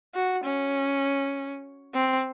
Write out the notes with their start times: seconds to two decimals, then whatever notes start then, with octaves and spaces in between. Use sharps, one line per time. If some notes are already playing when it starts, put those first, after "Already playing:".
0.15 F#4
0.45 C#4
1.95 C4